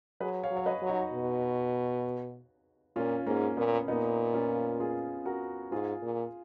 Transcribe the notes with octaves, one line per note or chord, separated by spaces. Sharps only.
F#3 G#4 B4
C#5 F5
F#3
C#5
B4 D#5
F#3
D#4 F#4
B2
A#2 C#4 F4
G#2 A#3 C#4
A#2 B3
A#2 B3 D#4
C#4 F4
F4 G#4
F#4 A#4
G#2 F4 G#4
A#2